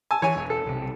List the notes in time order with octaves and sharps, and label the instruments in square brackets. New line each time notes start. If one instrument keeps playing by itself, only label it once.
[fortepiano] G#5 A5 E6
[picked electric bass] E3 [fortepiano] C#5 G#5
[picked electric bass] E1
[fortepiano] A4
[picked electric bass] B1 C3